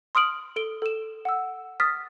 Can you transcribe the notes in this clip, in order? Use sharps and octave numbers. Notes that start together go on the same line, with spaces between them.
C6 D#6 F6 D7 F#7
A4 D7 G7
A4 E7
F#5 E6
D#6 F6 A6 B6